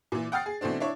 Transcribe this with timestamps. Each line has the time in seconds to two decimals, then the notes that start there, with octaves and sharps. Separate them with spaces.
0.12 A#2 E3
0.32 F#5 G5 D#6 F6 A6 C7
0.46 G#4
0.61 B2 E3 A3 C4 D4
0.80 D4 E4 C#5